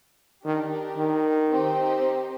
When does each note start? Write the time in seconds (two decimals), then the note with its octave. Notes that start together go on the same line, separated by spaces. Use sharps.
0.44 D#3 D4 G4 A#4
0.97 D#3
1.49 C4 D#4 G4 C5